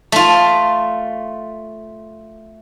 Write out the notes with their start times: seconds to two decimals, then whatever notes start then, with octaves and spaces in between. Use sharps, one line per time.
0.12 A3 F4